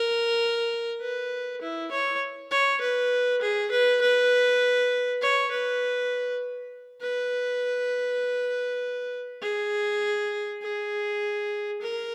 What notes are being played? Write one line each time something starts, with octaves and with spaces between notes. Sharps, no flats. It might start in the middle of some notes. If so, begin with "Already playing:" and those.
Already playing: A#4
B4
E4
C#5
C#5
B4
G#4
B4
B4
C#5
B4
B4
G#4
G#4
A#4